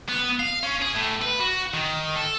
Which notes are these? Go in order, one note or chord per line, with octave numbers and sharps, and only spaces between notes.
B3
F5
C#4
G#4
A2
B4
F#4
D#3
A4